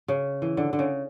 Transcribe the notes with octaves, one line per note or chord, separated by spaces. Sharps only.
C#3
E3
D3
D3
C#3